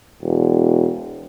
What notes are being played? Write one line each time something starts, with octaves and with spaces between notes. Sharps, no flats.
E1